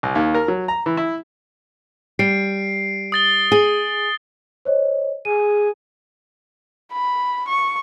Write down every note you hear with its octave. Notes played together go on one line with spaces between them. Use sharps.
C2
D#2
A#4
F#3
A#5
E3
E4
G3 C7 D7
D#6 A6 G7
G#4
C5 C#5 D#5
G#4 D#7
B5
C#6